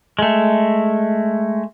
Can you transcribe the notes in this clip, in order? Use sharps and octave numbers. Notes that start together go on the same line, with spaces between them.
G#3 A3